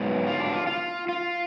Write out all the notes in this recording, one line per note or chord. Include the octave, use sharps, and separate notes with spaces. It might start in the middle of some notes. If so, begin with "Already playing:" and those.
Already playing: G#2 F#3 B3
F4
D4
F4
F4
F4